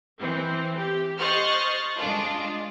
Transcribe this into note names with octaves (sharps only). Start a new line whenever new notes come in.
E3 C4
G4
C5 D#5 C#6 F6 F#6 A6
G#3 D4 F4